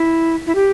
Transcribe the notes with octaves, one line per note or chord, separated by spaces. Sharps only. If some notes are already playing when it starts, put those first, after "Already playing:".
Already playing: E4
E4
G4